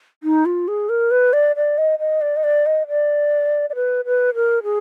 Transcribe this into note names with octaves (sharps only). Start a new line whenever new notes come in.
D#4
F4
G#4
A#4
B4
D5
D5
D#5
D#5
D5
D#5
D5
D#5
D5
D5
B4
B4
A#4
G#4